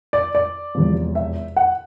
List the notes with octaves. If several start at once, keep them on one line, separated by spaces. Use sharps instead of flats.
D5
D5
E1 E2 C3 F3
E5
F#5